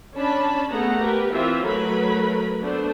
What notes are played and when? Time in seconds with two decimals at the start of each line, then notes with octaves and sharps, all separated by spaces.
0.14 C#4 D4 A5 B5
0.70 A3 B3 G#4 F#5 A#5
1.01 G4 A#4 B4
1.32 E3 C4 F4 E5
1.64 F#3 A3 A#4 B4 B5
2.60 A3 B3 D4 C5